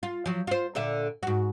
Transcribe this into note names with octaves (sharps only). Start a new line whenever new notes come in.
F4
F3 F#3
F4 C5
A#2 D3 E5
G#2 F#4